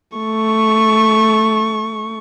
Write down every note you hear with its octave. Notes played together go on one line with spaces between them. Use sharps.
A3 C#6